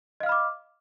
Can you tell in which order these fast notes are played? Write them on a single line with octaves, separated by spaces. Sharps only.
D#5 F5 F6 B5 D6